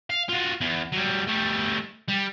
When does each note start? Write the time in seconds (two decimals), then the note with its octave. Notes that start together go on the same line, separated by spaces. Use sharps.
0.10 F5
0.29 F4 F#4
0.61 E2
0.94 F#3 G3
1.28 G3 A3
2.08 G3